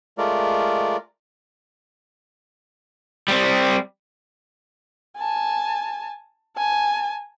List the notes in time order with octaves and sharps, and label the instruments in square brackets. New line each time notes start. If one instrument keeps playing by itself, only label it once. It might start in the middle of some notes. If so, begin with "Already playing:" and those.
[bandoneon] G#3 A3 F4 A#4 D5
[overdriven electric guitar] G3 C4
[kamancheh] G#5 A5
G#5 A5